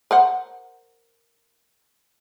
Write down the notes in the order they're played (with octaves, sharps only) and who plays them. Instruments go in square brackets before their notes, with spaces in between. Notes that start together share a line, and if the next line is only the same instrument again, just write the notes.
[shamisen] A#4 C5 F#5